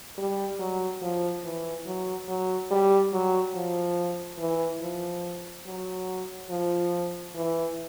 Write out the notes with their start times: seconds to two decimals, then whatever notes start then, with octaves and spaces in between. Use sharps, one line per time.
0.18 G3
0.59 F#3
1.02 F3
1.44 E3
1.86 F#3
2.28 F#3
2.71 G3
3.13 F#3
3.55 F3
4.39 E3
4.81 F3
5.66 F#3
6.50 F3
7.35 E3